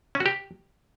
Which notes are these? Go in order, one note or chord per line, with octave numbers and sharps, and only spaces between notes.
C#4
F#4
G4